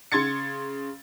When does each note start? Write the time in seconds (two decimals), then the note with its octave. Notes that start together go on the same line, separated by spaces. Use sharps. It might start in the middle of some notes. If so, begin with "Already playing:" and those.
0.12 C#3 C6 G#6 A6 C#7